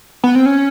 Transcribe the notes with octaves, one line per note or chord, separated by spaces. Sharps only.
B3
C4
C#4